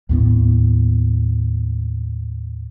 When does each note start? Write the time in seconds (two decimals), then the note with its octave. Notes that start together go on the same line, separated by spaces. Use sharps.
0.09 D#2 A2 B3